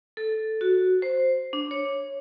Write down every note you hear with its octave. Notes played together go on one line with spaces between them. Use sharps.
A4
F#4
C5
D4
C#5